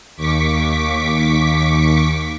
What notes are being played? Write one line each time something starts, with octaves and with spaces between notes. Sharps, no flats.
D#2 C#6 D6 B6